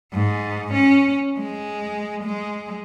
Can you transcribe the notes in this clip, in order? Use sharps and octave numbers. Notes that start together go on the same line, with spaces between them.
G#2
C#4
G#3
G#3